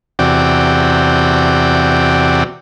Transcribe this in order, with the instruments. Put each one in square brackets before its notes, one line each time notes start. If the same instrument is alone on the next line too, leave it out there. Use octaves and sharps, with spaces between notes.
[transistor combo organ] E2 C3 F#4 D5 G5